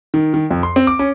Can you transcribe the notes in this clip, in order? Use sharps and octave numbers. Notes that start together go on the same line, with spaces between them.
D#3
D#3
F2
C6
C4
D6
C#4